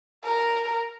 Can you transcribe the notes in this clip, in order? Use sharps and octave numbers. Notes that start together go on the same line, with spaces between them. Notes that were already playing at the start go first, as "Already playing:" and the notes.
A#4